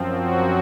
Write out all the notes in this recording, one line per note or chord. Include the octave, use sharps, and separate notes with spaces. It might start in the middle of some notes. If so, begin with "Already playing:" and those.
Already playing: F#2 F3 C4
F#3 F#4